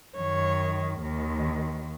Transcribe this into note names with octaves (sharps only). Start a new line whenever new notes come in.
F#2 D#3 C#5
D#2 D#3